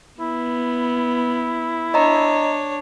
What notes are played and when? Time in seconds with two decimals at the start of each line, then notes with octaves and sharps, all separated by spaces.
0.20 B3 E4
1.94 D4 C#5 D#5 A#5